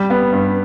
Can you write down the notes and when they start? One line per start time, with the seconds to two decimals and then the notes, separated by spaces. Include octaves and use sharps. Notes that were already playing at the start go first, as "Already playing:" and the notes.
Already playing: G3
0.10 B3
0.33 G2